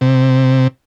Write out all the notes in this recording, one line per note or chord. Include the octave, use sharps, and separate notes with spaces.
C3